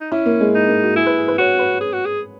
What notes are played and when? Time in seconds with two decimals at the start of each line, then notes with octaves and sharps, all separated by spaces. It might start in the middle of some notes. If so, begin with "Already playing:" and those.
0.01 D#4
0.12 C#4 E4
0.26 A#3
0.40 G#3
0.55 D#4
0.68 A#3
0.83 F#4
0.96 E4 G#4
1.06 B4
1.18 G#4
1.28 B4
1.38 F#4 C#5
1.59 B4
1.81 G#4
1.93 F#4
2.06 G#4